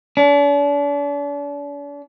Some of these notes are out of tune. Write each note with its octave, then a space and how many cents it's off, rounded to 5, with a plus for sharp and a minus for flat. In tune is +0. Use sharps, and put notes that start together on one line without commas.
D4 -40